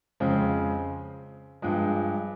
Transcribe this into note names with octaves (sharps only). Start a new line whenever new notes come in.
F2 C#3 G#3 C4
G2 F3 G#3